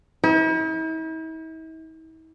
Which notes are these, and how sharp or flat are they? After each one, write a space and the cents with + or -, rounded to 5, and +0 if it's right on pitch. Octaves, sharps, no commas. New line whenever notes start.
E4 -45